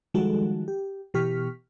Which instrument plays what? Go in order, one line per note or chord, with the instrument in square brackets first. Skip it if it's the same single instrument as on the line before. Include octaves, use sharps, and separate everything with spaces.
[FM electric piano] D#3 F3 G3 G#3 F#4 A4
G4
B2 E3 G4 C#6 F6 B6